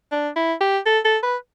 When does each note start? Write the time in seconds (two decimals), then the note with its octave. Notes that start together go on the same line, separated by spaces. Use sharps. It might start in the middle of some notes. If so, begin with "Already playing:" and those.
0.12 D4
0.36 E4
0.61 G4
0.86 A4
1.05 A4
1.23 B4